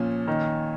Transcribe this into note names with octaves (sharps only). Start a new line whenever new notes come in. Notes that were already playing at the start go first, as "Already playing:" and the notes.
Already playing: A#2 F3 C#4
D#3